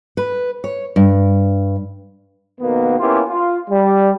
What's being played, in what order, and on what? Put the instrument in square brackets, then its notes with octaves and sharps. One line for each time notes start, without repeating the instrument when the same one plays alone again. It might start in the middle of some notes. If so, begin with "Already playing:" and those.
[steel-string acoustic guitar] B4
C#5
G2
[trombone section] F2 B2 D#3 A#3 B3
A#3 B3 C#4 E4 F4 G4
F4
G3